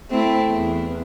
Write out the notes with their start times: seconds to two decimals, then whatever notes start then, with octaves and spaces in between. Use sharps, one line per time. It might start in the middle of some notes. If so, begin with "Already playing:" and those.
0.10 A3 C4 E4
0.50 E2